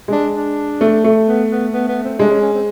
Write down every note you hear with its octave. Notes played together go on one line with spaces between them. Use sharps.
G#3 D4
D4
A3
A3
B3
B3
B3
B3
C4
G#3 D4
C#4
C#4
C4